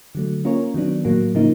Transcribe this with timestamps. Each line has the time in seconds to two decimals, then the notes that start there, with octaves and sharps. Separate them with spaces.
0.15 D3 F#3 A3
0.45 A#3 C#4 F4 A#4 C#5
0.74 D#3 F#3 B3 D4
1.05 A2 F#3 A#3
1.35 C#3 F3 A#3 D#4